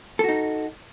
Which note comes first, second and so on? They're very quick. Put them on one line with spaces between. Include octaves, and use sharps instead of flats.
A4 F#4 D#4